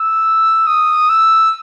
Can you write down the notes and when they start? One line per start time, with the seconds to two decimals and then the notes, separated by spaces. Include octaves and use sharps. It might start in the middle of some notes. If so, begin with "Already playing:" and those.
Already playing: E6
0.67 D#6
1.10 E6